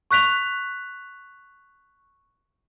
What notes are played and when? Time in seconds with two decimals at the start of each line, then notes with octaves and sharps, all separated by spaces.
0.11 C#6 F#6 B6 F7